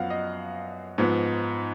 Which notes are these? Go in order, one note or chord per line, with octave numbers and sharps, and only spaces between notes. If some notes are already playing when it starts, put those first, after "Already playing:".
Already playing: F#2 F3 B3 F5 F#5
D#5
G#2 F3 B3